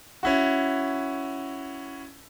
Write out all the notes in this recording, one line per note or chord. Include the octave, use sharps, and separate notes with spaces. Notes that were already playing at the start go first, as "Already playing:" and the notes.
C#4 E4 F#4